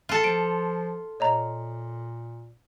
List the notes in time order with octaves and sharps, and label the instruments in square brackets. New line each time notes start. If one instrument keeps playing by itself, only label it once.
[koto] F4 A4
[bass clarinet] F3 [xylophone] D7
[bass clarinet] A#2 [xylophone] C#5 D#5 A#5